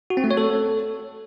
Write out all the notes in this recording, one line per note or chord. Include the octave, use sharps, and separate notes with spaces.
F#4
C4
A3
C#5
A4